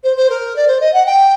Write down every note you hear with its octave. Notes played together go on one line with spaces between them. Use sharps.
C5
C5
A#4
D5
C5
D#5
F#5
G5